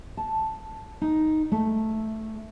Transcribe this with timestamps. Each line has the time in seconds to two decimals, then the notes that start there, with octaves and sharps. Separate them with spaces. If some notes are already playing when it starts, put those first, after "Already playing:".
0.17 A5
1.02 D#4
1.52 A3